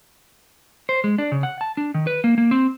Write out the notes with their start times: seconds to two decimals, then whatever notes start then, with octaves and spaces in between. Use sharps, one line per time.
0.89 C5
1.04 G#3
1.18 D4
1.32 C#3
1.43 F#5
1.61 A5
1.77 D4
1.94 D#3
2.07 B4
2.24 A#3
2.38 A#3
2.51 C4